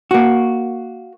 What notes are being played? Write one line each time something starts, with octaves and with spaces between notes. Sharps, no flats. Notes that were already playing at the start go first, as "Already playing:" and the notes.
A#3 F#4